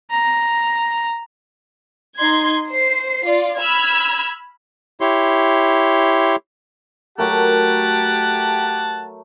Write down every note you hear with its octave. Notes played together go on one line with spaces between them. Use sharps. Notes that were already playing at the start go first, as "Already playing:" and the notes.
A#5
D#4 C6 G#6
C5 C7
F4 D5
B5 E6 F6 G#6
E4 G4 C#5 C6
F#3 A3 G4 A#4 F#5 A5